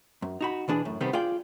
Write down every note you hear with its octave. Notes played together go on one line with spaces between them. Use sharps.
F#2
D#4 F#4 B5
B2 E3 D4 G#4
F#2 A2
C2 C3 D#3 G3 B3 C5
F4 G#4 D5 G5